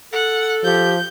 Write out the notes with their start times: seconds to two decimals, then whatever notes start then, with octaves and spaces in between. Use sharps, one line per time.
0.13 A4 F#5
0.64 F3 G4 G6